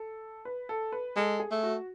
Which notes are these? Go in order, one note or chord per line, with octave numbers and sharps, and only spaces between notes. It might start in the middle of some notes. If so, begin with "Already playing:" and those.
Already playing: A4
B4
A4
B4
G#3 A4
G#4
A3
F#4